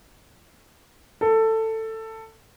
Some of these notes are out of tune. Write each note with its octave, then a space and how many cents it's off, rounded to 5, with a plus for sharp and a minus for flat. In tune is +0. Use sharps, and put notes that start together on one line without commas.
A4 +15